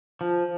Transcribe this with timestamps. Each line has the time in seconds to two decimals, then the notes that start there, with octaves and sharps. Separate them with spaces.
0.21 F3